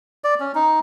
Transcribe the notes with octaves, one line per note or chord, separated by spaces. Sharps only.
D5
C#4
D#4